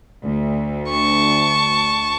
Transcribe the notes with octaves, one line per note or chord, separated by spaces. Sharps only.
D2
A5 C#6